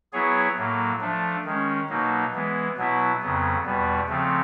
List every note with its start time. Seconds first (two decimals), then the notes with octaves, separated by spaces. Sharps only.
0.13 F#3 B3 E4 G#4 C#5
0.57 A2 F#3 A#3
1.01 F3 A3 D4
1.45 D#3 G#3 C#4
1.89 B2 F#3 A#3 D#4
2.34 E3 G#3 B3
2.77 B2 F#3 B3 E4
3.21 F2 C#3 F#3 B3
3.66 E2 B2 G3 B3
4.09 C#3 F3 A3 C4